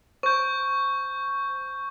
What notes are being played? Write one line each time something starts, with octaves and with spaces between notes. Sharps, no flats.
C5 C#6 G6